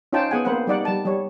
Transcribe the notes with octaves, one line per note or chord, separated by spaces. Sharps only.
C#4 D#4 F4 C5 G5 A5
B3 G#4 F#5 G#5
A#3 C4 B4 C5 F#5
G3 D#4 D5 F#5
G3 A5
G3 C#5